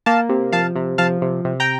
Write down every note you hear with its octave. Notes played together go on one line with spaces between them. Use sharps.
A#3 F5 A5
C3
F3 F5 A5
C3
F3 F5 A5
C3
C3
G5 A#5